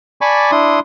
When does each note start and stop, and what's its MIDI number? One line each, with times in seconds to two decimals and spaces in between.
0.21 0.51 74
0.21 0.51 80
0.21 0.51 81
0.21 0.51 83
0.21 0.51 85
0.21 0.51 86
0.51 0.80 62
0.51 0.80 64
0.51 0.80 84
0.51 0.80 87